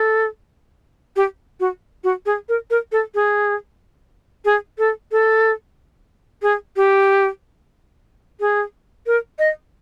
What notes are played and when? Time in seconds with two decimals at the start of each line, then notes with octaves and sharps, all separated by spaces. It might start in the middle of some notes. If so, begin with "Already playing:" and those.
Already playing: A4
1.16 G4
1.60 F#4
2.04 F#4
2.26 G#4
2.49 A#4
2.70 A#4
2.92 A4
3.15 G#4
4.45 G#4
4.78 A4
5.12 A4
6.42 G#4
6.76 G4
8.40 G#4
9.07 A#4
9.39 D#5